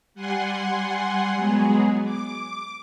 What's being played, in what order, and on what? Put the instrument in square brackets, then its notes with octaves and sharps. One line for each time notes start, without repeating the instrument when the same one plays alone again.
[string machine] G3 F#5 G#5 C6
F#3 G#3 B3 G#4
D6